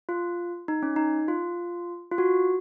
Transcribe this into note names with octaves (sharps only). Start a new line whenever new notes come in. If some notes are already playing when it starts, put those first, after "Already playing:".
F4
D#4
C#4
D#4
F4
F4
F#4